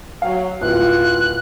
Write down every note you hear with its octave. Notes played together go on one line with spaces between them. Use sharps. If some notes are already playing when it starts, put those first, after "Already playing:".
F#3 F5
D1 F4 F#6